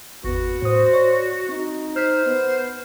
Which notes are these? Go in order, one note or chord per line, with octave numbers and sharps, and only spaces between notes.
G#1 E2 B3 F#4
A2 C5 D#6
C#5 D5 C#6
C4 D#4
C5 F6 B6
B3